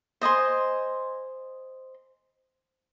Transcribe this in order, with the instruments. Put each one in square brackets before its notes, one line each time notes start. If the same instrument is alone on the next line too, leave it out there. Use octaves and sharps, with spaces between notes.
[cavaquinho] C5 D#5 G#5 C6